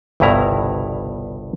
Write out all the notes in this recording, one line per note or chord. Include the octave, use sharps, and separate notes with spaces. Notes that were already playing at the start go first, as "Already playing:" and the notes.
G1 C2 G2 B2 E4 A#5